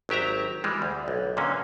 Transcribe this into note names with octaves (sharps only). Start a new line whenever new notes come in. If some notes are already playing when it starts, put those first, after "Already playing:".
G#1 F#3 G4 E5 A#5
E3 G3 G#3
D2
B1
A#2 D3 A#3 C#4